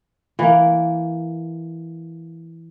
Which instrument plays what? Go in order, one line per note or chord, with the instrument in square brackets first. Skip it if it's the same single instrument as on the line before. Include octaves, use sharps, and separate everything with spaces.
[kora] E3 A#3